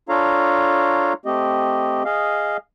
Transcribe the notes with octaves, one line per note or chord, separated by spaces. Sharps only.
D4 F4 A4 C#5 F5 A#5
A3 C4 G4 D#5
G#4 D#5 F5